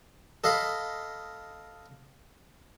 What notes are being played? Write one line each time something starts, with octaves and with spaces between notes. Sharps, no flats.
A4 D#5 F5 B5